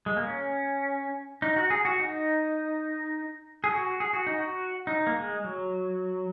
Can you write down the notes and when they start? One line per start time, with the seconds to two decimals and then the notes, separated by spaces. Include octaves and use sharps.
0.06 G#3
0.16 A#3
0.27 C#4
1.42 D#4
1.56 F#4
1.70 G#4
1.85 F#4
2.00 D#4
3.64 G#4
3.72 F#4
4.00 G#4
4.13 F#4
4.27 D#4
4.39 F#4
4.87 D#4
5.07 A#3
5.16 G#3
5.44 F#3